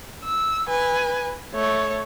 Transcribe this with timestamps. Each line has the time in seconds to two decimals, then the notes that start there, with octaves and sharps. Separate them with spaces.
0.24 E6
0.68 B4 G#5
1.54 A3 C#5